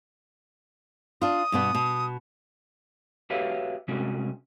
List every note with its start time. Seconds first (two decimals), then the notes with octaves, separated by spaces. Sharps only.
1.22 D4 F4 D#6
1.52 G2 B2 B3
1.75 B2
3.30 F#4 G4 B4 C#5 E5 F5
3.88 C3 G3 G#3 C#4 F#4